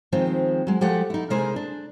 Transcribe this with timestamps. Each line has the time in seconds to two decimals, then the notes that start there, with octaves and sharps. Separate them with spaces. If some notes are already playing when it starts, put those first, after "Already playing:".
0.12 D#3 F3 G#3 C4
0.67 F#3 G#3
0.81 F3 G#3 A3 G4 A4 F#5
1.10 D#4 E4
1.30 C3 G#3 E4 G#4 A#4 C5
1.56 D4